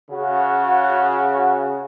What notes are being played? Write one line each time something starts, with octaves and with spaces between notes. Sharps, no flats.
C#3 F#4